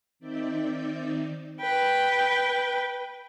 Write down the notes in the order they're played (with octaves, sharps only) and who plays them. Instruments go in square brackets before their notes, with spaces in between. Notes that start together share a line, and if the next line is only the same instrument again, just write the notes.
[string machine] D#3 C4 D#4 D5 E5 G6
[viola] B4 G5